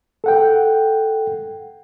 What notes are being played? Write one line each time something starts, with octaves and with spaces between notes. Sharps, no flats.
A4 F#5 G5